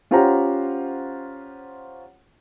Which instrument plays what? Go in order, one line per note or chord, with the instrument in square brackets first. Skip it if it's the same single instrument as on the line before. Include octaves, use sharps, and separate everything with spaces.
[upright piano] C#4 F4 G4 C5 F#5 A#5